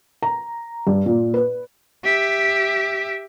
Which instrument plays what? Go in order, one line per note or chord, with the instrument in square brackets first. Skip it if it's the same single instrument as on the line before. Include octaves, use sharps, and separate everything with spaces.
[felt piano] A#5
G2
A#2
B4
[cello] G4 E5